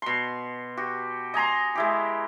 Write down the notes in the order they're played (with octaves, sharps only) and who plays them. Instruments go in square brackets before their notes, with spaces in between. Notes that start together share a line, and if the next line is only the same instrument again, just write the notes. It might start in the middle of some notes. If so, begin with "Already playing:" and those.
[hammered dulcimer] B2 C6
F#4 G4
D#5 G#5 A#5 C6
G#3 E4 G4